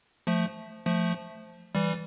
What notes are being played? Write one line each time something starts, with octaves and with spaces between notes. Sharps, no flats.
F3 A3
F3 A3
E3 G3